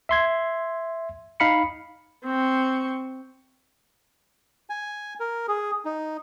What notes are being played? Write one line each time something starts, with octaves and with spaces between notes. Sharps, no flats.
E5 C6 G#6
D#4 F5 B5 C#7
C4 C#6
G#5
A#4
G#4
D#4